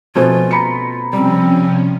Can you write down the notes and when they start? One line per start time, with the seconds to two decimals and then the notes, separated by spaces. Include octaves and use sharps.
0.15 B2 F3 A3 C4 C#4 F4
0.51 A#5 B5 C#7
1.13 C3 F3 G3 C4 C#4